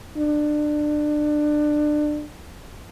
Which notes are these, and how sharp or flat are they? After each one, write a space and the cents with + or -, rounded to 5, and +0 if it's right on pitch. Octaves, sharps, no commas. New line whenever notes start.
D4 +25